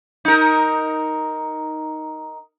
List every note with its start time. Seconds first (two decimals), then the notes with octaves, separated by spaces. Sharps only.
0.25 D#4 A#4